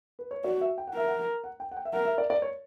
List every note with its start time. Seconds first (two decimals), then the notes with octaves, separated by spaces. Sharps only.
0.19 B4
0.31 C#5
0.44 F#4 D5
0.61 E5
0.78 G5
0.87 F#5
0.94 A#4 E5
1.07 F#5
1.44 F#5
1.60 G5
1.71 F#5
1.77 G5
1.85 E5
1.93 A#4 F#5
2.05 E5
2.18 D5
2.30 D5
2.42 C#5